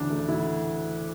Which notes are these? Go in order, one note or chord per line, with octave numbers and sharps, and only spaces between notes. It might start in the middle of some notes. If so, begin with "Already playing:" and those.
Already playing: D2 C#3 E3 D4
A3
E3 E4